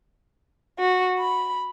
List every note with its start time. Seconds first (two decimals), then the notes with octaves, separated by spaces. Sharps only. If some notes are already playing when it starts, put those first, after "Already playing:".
0.79 F#4
1.18 B5